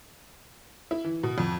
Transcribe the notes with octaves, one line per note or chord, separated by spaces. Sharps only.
E4
E3
B2
F2